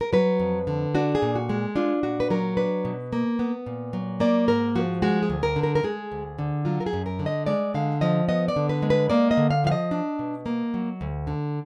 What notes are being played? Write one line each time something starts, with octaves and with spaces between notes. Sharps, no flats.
A#4
F#3 B4
F2
D3
D4 F#4
G#4
A#2
F#4
G#3
D4 F4
A#2 F#4
B4
F#3 A#4
D4 B4
B2
A#3
B3
A#2
F#3
A#3 D5
G#2 A#4
F3 F#4
G#3 F#4
G#4
D2
A#4
D3
A#4
A#4
G#3 G#4
D2
D3
F#3 F4
A#4
G#4
F#2
A#4
D3
D#5
G#3 D5
D3 F5
F3 D#5
B3 D#5
D5
D3
B4
G#3
B4
A#3 D5
D#5
D3
F5
F3 F5
D#5
D4
B2
A#3
F#3
D2
D3